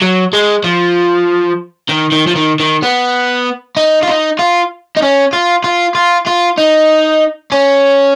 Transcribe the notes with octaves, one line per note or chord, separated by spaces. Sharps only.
F#3
G#3
F3
D#3
D#3
F3
D#3
D#3
B3
D#4
F4
D#4
F4
D#4
C#4
F4
F4
F4
F4
D#4
C#4